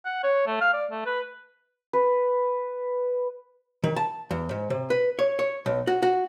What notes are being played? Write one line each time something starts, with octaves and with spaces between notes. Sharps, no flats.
F#5
C#5
A3
F5
D5
A3
B4
B4
D#3
A5
E2
G#2
C3
B4
C#5
C#5
B1
F#4
F#4